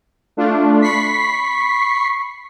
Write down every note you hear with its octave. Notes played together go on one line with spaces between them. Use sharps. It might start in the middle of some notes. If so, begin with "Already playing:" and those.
A3 D4 F4
B5 C#6 B6 C7